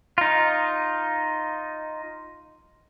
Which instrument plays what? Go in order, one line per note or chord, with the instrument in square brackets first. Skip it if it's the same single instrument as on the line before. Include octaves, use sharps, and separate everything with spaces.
[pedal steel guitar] D#4 F4